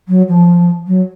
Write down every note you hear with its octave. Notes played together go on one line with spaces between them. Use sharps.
F#3
F3
F#3